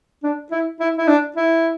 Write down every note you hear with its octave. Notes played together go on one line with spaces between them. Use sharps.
D4
E4
E4
E4
D4
E4